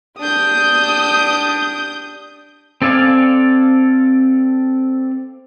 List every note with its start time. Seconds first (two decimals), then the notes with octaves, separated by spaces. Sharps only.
0.19 D4 G4 D#6 G6
2.82 C4 A4 D5 F5 G#5